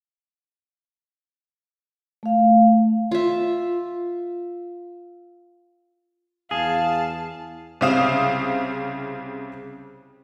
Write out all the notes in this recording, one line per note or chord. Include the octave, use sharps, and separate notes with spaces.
A3 F5
F4 E5
E2 G#4 F5 A5
C2 C#3 C4 F5 D#6 E7